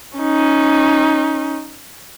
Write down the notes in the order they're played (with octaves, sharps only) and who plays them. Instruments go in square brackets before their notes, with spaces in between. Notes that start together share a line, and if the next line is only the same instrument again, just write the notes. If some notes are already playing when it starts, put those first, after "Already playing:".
[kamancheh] C#4 D#4